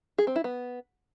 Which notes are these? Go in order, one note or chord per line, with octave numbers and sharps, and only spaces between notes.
G#4
C4
E4
B3